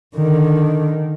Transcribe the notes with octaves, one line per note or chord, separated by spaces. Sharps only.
D3 D#3